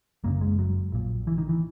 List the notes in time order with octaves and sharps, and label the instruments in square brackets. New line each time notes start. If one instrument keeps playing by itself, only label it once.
[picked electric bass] F#1 F#2 C#3 A#3
G#3
F#3
A#1 A#2
E3
D#3
E3